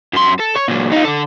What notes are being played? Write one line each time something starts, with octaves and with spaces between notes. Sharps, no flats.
F#2 C6
A4
C#5
A#2 F#3
D#4 F4
D3 A4